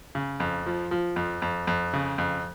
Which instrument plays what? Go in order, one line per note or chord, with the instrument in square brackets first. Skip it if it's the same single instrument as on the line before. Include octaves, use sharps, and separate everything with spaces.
[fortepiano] C#3
F2
F3
F3
F2
F2
F2
C#3
F2